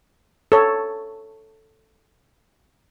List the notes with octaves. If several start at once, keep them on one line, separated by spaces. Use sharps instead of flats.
A4 C#5